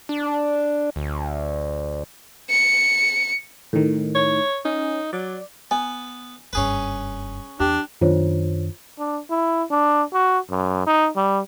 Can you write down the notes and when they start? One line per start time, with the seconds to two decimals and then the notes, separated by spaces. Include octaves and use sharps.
0.09 D4
0.96 D2
2.50 C#7
3.73 A2 D#3
4.15 C#5
4.65 C#4 D#4
5.13 F#3 D5
5.71 B3 G#5
6.53 F#1 G2 C#4 G#4 B4
7.60 E2 D4 G4
8.01 F#2 D#3 D4 F4 C5 C#5
8.99 D4
9.30 E4
9.71 D4
10.14 F#4
10.50 F#2
10.87 D#4
11.17 G3